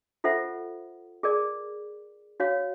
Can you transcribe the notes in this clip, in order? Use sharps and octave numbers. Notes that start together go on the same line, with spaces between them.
F4 A4 C5 E5 F#5
G#4 A#4 D5
F#4 C#5 F5